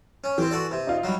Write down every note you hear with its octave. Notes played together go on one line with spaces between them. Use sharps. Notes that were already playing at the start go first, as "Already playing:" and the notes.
C#4
E3 C4 G4
F#4 A4 D5
C3
D#4 F4
F#3 G3